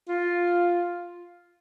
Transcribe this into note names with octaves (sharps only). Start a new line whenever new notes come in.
F4